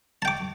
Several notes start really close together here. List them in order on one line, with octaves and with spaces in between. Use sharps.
A5 G5 D6